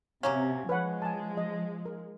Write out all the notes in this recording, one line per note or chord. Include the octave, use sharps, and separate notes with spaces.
C3 F#3 A#3 C#4
F3 G#3 B4 C#5 F#5
G#5 A5
D#5
A#4